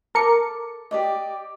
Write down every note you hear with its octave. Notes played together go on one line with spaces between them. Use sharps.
A4 A#4 D6 C#7
G4 D5 D#5